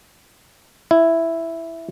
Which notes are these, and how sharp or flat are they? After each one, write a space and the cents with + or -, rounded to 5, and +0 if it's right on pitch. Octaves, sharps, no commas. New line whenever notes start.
E4 +5